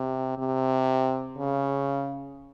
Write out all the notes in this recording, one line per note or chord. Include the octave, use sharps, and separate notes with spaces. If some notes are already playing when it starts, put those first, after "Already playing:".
Already playing: C3
C3
C#3